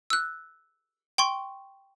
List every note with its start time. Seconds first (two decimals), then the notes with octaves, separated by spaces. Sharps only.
0.10 E6 F#6
1.18 G5 C6 C#6